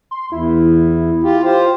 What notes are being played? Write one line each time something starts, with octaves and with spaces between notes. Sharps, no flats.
C6
E2 E4
F4 G4
F4 G4 C5